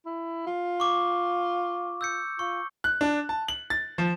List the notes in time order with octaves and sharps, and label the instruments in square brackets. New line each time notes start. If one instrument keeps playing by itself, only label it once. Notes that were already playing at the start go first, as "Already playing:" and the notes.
[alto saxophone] E4
F4
[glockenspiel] C#6 D6
E6 G6 C#7
[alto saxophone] F4 [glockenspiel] C#6
[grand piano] F#6
D4
A5
F#7
A6
F3